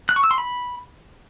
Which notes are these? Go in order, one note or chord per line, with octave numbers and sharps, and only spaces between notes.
F#6
C#6
E6
C6
B5